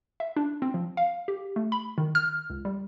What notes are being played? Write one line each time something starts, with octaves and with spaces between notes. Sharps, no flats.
E5
D4
C4
F3
F5
G4
A3
B5
D#3
F6
C#2
G3